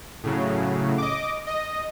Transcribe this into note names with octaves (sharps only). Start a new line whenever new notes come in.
A2 C#3 F#3
D#5 D6
D#5